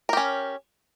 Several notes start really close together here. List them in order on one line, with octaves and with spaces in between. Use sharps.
A#4 G4 C#4